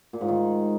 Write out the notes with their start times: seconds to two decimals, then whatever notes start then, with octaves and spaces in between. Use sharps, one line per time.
0.13 A#2
0.21 G#2
0.28 D#3